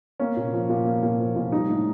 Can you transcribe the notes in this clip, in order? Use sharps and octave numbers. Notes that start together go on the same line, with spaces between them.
A#3 C#4
A#2
F3
A#2
A#3
A#2
F3
A#2
G3 D#4
A2